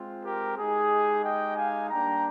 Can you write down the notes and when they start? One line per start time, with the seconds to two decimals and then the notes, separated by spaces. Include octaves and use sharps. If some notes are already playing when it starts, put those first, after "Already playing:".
Already playing: G#3 C4 F4
0.24 G4 A#4
0.58 G#3 D#4 G4 G#4
1.24 D#5 G5
1.57 F5 G#5
1.90 G3 A#3 D4 G4 G5 A#5